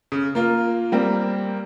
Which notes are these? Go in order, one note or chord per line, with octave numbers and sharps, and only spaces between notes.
C#3
A#3 F4
G3 A#3 C4